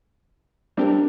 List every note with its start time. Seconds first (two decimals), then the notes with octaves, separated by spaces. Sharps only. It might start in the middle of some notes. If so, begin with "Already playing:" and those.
0.77 G3 C4 D4 G4 A#4